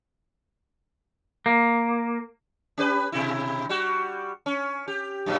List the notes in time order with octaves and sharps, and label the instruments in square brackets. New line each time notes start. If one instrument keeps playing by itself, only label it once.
[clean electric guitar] A#3
[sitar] C#4 G4 B4
B2 E4
G3 F#4
C#4
G4
F#2 A#2 F#3